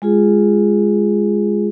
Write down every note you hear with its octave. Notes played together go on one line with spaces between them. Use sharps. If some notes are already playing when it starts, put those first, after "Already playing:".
G#3 F4 G#4